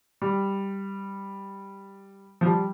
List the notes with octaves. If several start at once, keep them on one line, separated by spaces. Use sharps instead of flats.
G3
F3
G3